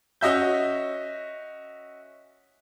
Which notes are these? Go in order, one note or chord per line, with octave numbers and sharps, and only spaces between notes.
C#4 F#4 D#5 E5 G6